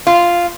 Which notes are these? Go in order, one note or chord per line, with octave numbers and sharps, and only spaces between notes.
F4